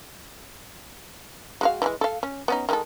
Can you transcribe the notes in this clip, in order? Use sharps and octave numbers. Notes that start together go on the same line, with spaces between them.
G#3 F#4 F5
E3 G3 G#3
A4 F5
C#4
B3 C#4 D#4
D#3 G#3 A4